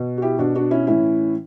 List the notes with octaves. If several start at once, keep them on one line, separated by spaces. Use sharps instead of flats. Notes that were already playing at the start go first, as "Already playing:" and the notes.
Already playing: B2
F#4
E4 G4
B2 D4 F#4
D4 F#4
C#4 E4
A2 E3 C#4 E4